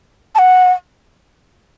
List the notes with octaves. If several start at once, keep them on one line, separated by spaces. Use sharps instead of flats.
A5
F#5